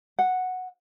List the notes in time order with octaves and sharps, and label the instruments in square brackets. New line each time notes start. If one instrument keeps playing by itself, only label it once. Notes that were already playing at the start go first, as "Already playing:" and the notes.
[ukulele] F#5